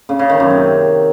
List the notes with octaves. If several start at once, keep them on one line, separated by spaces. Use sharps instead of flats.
C#3
C#3
D#3
F#2
C3